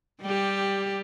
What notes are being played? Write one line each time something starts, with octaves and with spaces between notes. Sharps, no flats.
G3 G4